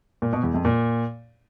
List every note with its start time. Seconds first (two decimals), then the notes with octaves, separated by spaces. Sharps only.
0.22 A#2
0.33 B2
0.43 E2
0.54 F2
0.65 A#2